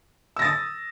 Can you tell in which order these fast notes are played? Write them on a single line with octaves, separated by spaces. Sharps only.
E6 A#6 A6 D#6